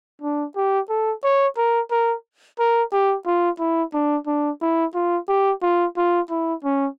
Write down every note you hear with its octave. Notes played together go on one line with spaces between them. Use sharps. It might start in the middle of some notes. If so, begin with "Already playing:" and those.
D4
G4
A4
C#5
A#4
A#4
A#4
G4
F4
E4
D4
D4
E4
F4
G4
F4
F4
E4
C#4